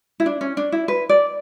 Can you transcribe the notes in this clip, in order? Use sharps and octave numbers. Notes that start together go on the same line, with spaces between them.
E4
D4
C#4
D4
E4
B4
D5